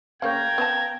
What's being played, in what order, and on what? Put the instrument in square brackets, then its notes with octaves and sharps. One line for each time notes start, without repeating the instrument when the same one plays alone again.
[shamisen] C#3 A#3 C#5 [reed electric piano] F5 G6 [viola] G5 A#5 [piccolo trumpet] G#6
[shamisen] B3 C5 A5